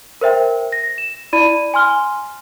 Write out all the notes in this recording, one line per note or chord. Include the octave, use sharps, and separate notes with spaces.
A#4 C5 E5 G5
A#6
E7
E4 D5 B5 D#7
G#5 C6 F6 G7